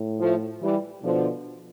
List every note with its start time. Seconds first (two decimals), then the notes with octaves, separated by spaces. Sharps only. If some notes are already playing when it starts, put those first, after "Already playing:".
Already playing: A2
0.20 F3 A3
0.62 E3 G3
1.03 B2 D3 F3